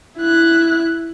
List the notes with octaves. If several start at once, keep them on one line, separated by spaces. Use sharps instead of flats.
E4 F#6